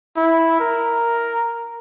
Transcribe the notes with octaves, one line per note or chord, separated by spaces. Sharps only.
E4
A#4